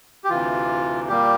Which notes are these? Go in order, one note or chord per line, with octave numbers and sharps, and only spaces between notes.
G4
D2 C3 E3 F4
A#2 G3 A#3 G4